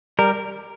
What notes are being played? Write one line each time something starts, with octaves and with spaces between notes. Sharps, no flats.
G3 A#4